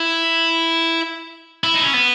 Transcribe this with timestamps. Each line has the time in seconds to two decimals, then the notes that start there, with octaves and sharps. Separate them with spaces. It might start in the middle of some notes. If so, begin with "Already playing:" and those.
Already playing: E4
1.64 E4
1.74 D#4
1.83 C#4
1.94 B3